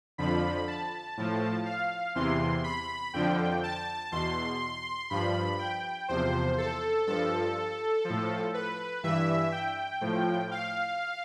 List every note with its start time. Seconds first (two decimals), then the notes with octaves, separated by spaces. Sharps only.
0.18 F2 D3 F3 B5
0.68 A5
1.17 A2 F3
1.66 F5
2.15 E2 C3 E3 C6
2.64 B5
3.14 F2 D3 F3 G5
3.63 A5
4.12 E2 B2 C6
5.10 G2 F3 B5
5.59 G5
6.08 E2 C3 F3 C5
6.58 A4
7.07 G2 F3 A4
8.05 F3
8.10 A2
8.54 B4
9.03 G2 E3 E5
9.52 G5
10.01 A2 F3
10.51 F5